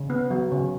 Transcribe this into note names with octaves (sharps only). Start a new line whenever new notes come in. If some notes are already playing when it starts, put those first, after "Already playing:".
Already playing: C#3
B3
F#3
C#3